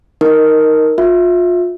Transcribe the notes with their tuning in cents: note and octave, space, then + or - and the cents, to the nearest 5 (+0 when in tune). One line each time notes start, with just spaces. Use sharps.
D#4 +10 A#4 +0
F4 +30 E5 +0